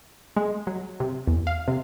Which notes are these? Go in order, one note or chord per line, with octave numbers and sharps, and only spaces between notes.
G#3
F#3
C3
E2
F5
C3